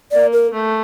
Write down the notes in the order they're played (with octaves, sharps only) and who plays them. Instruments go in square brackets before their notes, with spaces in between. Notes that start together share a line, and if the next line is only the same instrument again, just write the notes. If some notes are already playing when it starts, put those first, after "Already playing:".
[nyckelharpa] A#3 [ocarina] D5
[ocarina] A#4
[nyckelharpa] A3